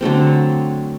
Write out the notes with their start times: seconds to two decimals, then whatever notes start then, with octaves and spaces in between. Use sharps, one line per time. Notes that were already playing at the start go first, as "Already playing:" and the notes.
0.01 D3 F#3 A3 C4